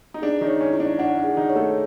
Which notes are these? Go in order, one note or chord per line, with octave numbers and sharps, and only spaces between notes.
D#4
D4 G#4
D#3 D#4
C#5
C#4
E4
D4
D4 F#5
D4
G#4
D#3 D#4
C#5
A3 A4